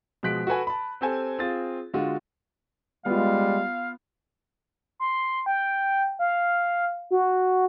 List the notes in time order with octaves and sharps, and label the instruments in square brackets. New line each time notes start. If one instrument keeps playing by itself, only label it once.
[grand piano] B2 F3 G#3 F#6 B6 D7
F#4 A4 B4 G#5
A5 B5
C4 G4 A4 C5 G#5
C4 F4 G#4 A6
D3 G#3 F4 F#4
[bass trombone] G3 [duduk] G#3 [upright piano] B3 F4 [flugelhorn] F5
[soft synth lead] C6
G5
F5
F#4